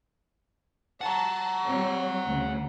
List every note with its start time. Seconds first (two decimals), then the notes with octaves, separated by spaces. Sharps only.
1.01 F#5 A5 A#5
1.66 G3 C4 C#5
2.27 D2 C#3